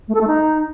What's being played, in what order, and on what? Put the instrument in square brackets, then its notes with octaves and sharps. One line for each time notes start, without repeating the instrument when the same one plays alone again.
[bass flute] A3
A4
A3
D#4